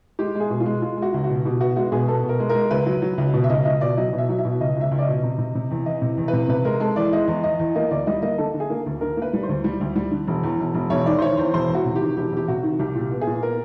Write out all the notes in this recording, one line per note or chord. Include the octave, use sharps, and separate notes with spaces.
G#3 G4
G#3
G#4
B2
F4
G#3
G#3 F4
G#3
F#4
C#2
F#4
B2
B2 G4
B3 F#4
G#3 F#4
B2 G#4
B3 A4
B2
A#4
G#3
A#4
G#3
C#2 B4
F#3
F#3
C#2
B2
E5
C#2 D#5
C#2 D#5
B2 D5
F#3 D#5
B2
E5
F#3
E5
B2
C#2 D#5
C#2 E5
C#2
D5
D#5
B2
C3
C3
C3
E2
E3 D#5
C3
E2
B4
C3
C3 B4
G#3 A#4
G#3 A4
E3 D5
G#3 D#5
E2
E2 D#5
E2
A#3 D#5
D2 D5
G3 D#5
A#3 D#5
D3 A4
D3
G#4
A#3
D2
D3 A#4
A#3 B4
G3
C5
D2
G3
D2
G3
D3
E1
E2
E1
E1
E1 C#5
D#3 D5
C5
D#3 C#5
E2 C5
E1 C5
E2
F#4
C3
G4
D#3
E1 G4
E1 G4
C3 F#4
D#3
C2 G4
A#2
G4
B3
G#4
A#2
B3 A#4